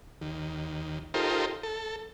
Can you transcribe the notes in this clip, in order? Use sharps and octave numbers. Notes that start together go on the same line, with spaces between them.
D#2
D#4 F4 G4 A4 A#4 C5
A4